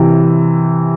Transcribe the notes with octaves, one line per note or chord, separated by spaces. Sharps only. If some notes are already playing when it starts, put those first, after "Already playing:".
Already playing: C3 E3